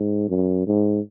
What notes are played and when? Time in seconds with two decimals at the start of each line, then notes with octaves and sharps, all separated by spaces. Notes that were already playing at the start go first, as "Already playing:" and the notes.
Already playing: G#2
0.29 F#2
0.67 G#2